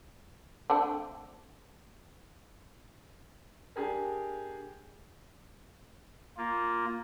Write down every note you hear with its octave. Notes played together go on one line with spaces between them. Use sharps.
A3 C4 D4
D4 G4 G#4 A#4
A#3 F4